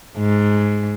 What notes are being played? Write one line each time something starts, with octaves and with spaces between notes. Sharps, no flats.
G#2